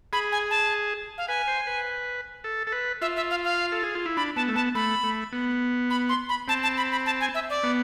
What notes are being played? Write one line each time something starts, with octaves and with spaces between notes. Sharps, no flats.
G#4 B5
G#5
A5
F5
B4 G#5
C5
B4
A4
A4
B4
F4 E5
E5
F5
F5
A4
G#4
F4
E4
D4 B5
B3 A5
A3
B3 A5
A3 B5
A3
B3
B5
C6
B5
C4 A5
A5
B5
B5
A5
G#5
E5
D5
B3